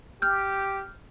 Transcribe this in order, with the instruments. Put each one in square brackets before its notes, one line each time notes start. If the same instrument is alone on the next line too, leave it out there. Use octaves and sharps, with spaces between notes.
[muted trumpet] G4 [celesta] F6 G6